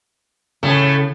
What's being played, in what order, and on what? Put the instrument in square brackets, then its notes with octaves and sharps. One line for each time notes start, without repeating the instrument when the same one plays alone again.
[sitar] A2 A3 [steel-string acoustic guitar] C#3